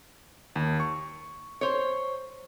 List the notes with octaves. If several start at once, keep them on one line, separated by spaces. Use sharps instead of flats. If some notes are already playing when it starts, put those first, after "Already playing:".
D#2
C#6
C5 C#5